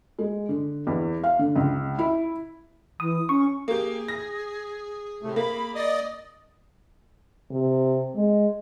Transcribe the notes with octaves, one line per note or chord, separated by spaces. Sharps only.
G#3
D3
E2
F5
D3
C#2
E4
E3 D#6
C#4 C#6
A#3 G4 G#4
A#6
A2 C3 A3
A#3 B5
D5 D#5 D#6
C3
G#3